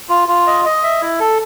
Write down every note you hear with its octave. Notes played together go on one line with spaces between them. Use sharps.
F4
F4
D#5
D#5
E5
E4
A4